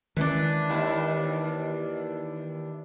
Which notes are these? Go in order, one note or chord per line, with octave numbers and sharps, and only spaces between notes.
D#3 E3 G#3 C#4 D4
D#2 E4